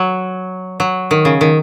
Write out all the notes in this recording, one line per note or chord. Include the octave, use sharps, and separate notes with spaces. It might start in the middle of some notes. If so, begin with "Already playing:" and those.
Already playing: F#3
F#3
D#3
C#3
D#3